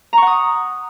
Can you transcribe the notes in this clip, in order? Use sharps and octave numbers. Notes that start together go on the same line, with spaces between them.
F#5 A#5 C#6 D#6